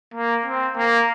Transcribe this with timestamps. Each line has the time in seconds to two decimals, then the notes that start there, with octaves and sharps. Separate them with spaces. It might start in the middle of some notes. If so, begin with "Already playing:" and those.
0.14 A#3
0.45 C4
0.76 A#3